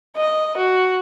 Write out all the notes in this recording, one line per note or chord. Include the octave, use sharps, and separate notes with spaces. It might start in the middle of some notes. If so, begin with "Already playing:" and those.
D#5
F#4